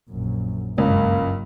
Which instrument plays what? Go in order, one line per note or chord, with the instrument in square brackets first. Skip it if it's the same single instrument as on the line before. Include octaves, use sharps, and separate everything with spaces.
[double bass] A#1 F#2
[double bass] F#1 G2 [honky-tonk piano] C#2 [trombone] A#3